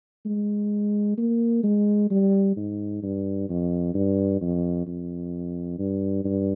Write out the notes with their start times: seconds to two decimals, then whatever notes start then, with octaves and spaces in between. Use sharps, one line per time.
0.26 G#3
1.18 A#3
1.64 G#3
2.11 G3
2.57 G#2
3.03 G2
3.49 F2
3.94 G2
4.41 F2
4.87 F2
5.78 G2
6.25 G2